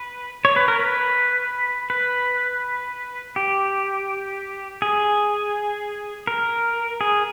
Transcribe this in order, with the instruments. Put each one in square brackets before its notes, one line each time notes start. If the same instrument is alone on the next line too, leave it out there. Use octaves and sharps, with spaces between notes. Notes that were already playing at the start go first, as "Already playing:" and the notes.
Already playing: [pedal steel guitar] B4
C#5
B4
A#4
B4
B4
G4
G#4
A#4
G#4